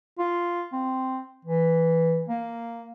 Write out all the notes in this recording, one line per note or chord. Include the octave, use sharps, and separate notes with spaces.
F4
C4
E3
A#3